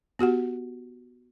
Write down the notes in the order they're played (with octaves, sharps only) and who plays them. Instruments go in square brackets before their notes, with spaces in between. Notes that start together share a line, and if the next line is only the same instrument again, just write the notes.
[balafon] B3 F#4 G4 F#5